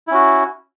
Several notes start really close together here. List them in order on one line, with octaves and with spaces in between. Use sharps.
E4 C#4 F#4